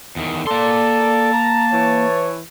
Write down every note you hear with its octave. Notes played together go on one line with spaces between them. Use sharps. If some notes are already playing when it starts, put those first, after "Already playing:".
E2 D#3
A#3 A4 D5 A5 C6
A#5
E3 C#5